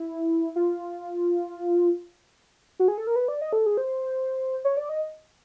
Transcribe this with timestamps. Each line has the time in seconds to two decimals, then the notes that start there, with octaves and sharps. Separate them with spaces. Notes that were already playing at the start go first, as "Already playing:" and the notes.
Already playing: E4
0.56 F4
2.79 F#4
2.88 G#4
2.98 A4
3.07 A#4
3.16 B4
3.28 D5
3.41 D#5
3.53 A4
3.66 G#4
3.77 C5
4.65 C#5
4.77 D5
4.89 D#5